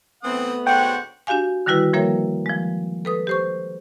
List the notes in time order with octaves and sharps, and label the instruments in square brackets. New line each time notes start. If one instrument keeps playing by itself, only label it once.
[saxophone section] E3 C4 [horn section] A3 B3 [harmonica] F#5 D#6
[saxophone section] D2 G#2 F#5 [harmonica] F#4 C5 C#5 [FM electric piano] G5
[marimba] D4 F#4 G4 F5 G#5
D3 D#3 G3 E4 F#4 B4
F3 G3 A#3 A#4 C#5 E5
F3 G#3
A4 B4 D#6
G4 C5 C#6